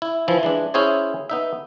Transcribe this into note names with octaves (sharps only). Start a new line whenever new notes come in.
E4
E3 F3 E4
E3 G#3 D4
C#4 E4 G#4 C5 C#5
B3 D#4 E5